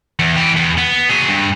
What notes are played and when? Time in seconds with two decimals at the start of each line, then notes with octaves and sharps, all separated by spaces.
0.19 E2
0.36 E3 G4
0.57 E2
0.78 B3
1.10 F#3 G#4
1.29 G2